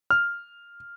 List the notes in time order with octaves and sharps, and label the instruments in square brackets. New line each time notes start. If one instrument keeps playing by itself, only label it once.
[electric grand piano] F6